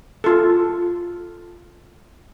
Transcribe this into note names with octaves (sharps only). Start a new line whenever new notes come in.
F4 A4